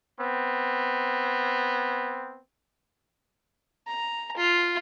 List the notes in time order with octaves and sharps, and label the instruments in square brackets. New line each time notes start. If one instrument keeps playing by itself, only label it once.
[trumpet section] B3 C4
[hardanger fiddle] A#5
F4